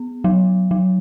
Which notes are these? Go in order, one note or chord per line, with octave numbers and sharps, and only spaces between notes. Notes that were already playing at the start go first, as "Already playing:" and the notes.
Already playing: B3
F#3
F#3